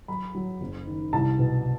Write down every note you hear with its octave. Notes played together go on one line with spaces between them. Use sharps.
F#3 B5
F#3
F#1
D#3
C2 A5
B2